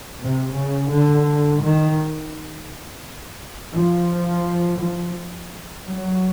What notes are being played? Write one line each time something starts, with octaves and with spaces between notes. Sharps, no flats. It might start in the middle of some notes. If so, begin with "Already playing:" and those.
C3
C#3
D3
D#3
F3
F3
F#3